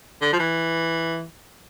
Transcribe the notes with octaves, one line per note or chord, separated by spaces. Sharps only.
D3
F3
E3